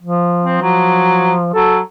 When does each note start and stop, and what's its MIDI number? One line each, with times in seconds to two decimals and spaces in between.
0.02 0.58 53
0.44 0.58 60
0.61 1.50 53
0.61 1.33 54
1.54 1.80 54
1.54 1.77 69